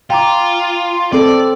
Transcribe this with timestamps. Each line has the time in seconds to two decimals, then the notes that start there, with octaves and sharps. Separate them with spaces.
0.10 F4 G5 A#5 D6
1.13 C4 A4 D5